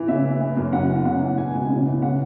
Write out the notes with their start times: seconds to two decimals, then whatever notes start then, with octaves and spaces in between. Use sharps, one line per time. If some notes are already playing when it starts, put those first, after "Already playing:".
Already playing: E3
0.08 C#3 E5
0.24 E3
0.41 E3
0.57 F#2
0.73 C#3 F#5
0.90 E3
1.05 C#3 F#5
1.22 E3
1.37 B2 G#5
1.54 C#2
1.70 C#3
1.86 E3
2.02 C#3 F#5